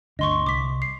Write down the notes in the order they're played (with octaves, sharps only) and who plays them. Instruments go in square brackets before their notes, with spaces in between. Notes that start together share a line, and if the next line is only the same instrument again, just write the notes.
[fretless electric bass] G1 D2 D4 [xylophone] D#5 C6 C#6
[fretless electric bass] C2 [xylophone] D6 B6
[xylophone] C7